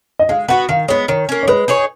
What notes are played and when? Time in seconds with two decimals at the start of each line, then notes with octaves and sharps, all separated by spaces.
0.19 D#5
0.29 G#3 F5
0.48 B3 F#4 B4 F#5
0.69 D#3 F5
0.88 G#3 B3 C#5
1.08 D#3 C#5
1.29 A#3 C#4
1.43 C#5
1.48 G#3 B4
1.68 D#4 G#4 C#5